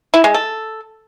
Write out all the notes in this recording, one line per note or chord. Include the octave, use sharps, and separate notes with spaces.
E4
G#3
A4